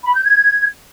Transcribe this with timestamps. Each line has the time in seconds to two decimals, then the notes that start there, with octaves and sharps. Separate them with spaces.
0.03 B5
0.14 G6
0.24 G#6